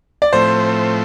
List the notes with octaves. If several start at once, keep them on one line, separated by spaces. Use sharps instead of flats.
D5
A2 F3 A3 C4 C5